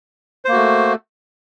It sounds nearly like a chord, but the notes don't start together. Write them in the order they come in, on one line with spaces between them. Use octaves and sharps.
C5 A#3 F#4 A3